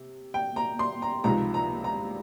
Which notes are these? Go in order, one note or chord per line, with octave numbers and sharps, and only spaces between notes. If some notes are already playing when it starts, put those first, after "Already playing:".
Already playing: C3
G5
A#5
C6
A#5
C#2 C3 F3 G#3 D#4 A#5
A#5
A#5